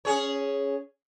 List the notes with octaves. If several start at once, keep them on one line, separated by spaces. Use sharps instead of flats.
C#4 G#4 C#5